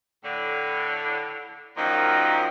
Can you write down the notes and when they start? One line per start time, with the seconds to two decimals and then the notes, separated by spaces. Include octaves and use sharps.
0.24 A2 D3
1.77 F#2 A#2 D#3 F3